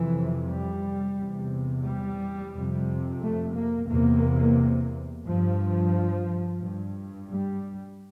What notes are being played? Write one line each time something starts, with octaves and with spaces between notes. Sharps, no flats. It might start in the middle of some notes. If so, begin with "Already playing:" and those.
Already playing: F2 C3 E3
G3
E2 C3
G3
F2 C3
A3
A#3
E2 C3 A#3
G2 F3
G2
G3